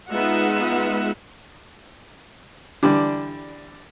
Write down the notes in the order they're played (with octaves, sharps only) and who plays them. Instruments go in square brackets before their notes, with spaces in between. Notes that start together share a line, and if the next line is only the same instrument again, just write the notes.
[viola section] G#3 B3 D#4 F4 E5 F#5
[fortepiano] D3 E3 G3 D4